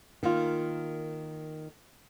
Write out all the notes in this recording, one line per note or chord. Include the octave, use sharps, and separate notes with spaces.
D#3 A#3 F4